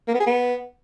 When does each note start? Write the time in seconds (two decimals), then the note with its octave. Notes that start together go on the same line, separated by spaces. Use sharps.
0.08 A#3
0.14 B3
0.20 G#4
0.26 B3